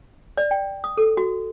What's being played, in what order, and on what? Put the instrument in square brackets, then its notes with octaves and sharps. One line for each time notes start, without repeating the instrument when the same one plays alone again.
[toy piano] D5
G5
D#6
A4
F#4